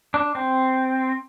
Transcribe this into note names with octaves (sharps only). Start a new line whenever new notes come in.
D4
C4